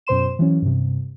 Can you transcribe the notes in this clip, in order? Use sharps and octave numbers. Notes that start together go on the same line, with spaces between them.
F#2 B2 C5 C6 E7
E3 F#3 C#4
G2 C3